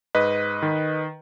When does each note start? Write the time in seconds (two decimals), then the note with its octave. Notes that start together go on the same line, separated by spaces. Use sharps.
0.15 G#2 B4 D#5
0.62 D#3